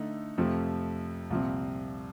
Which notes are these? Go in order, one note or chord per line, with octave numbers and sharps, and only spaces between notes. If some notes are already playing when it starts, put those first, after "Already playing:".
Already playing: D3 A3 D#4
F2 C3 F3 A3
C2 A#2 F3 C4